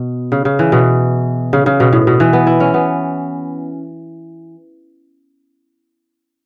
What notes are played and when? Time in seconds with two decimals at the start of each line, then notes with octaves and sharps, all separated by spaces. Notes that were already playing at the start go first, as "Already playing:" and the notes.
Already playing: B2
0.32 C#3
0.45 C#3
0.59 E3
0.72 B2
1.53 C#3
1.66 C#3
1.80 B2
1.93 A2
2.07 B2
2.20 E3
2.33 B3
2.47 E4
2.60 C#4
2.74 B3